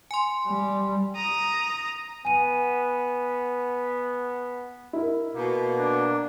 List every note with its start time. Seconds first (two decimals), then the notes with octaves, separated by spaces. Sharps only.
0.11 G#5 C6
0.47 G3
1.16 A#5 D#6
2.25 B3 G#5 D#7
4.93 E4 A#4
5.36 B2 A#3
5.78 D4